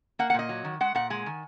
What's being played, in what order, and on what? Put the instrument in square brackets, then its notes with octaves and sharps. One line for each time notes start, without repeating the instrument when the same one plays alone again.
[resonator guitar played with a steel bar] A#3 F#5
F#5
A#2 D#5
F#3
D#3
G#3 F#5
A#2 F#5
G#3 G#5
D#3